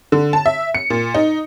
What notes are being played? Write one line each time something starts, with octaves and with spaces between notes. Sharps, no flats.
D3
A5
E5
C#7
A#2
D#4